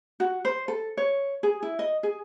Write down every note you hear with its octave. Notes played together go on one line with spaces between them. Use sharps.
F#4
C5
A4
C#5
G#4
E4
D#5
G#4